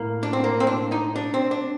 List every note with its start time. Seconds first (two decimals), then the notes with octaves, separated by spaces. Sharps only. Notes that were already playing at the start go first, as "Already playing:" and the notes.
Already playing: A2 A#3
0.23 D4
0.33 C4
0.44 A#3
0.60 C4
0.67 D4
0.92 D#4
1.16 D4
1.34 C4
1.51 D4